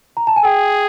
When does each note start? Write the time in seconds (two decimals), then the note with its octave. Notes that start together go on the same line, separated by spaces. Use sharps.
0.17 A#5
0.27 A5
0.36 G#5
0.44 G#4 G5